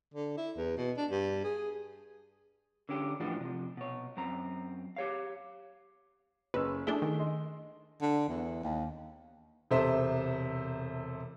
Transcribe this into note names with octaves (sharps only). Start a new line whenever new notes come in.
D3
E4
E2
B2
D4
G2
G#4
D3 C#4 D4 G4
A2 E3 F3 D4 F#4 G4
C3 F3
B2 C#5
F#2 C4 A#5
G4 C#5 F5
F#1 C#4 B4 E6
A3 D4 E4 G#4 G7
D#3
D#5 C6
D3
E2
D#2
E1 C3 A4 C5 E5